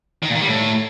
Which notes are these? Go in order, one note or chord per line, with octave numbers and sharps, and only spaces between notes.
D#3
A#2
D#3
G3
A2